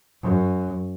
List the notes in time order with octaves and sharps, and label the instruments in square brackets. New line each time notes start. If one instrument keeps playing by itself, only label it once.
[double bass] F#2